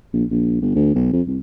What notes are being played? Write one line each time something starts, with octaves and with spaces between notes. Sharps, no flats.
A#1
A#1
G1
D2
B1
F2
C2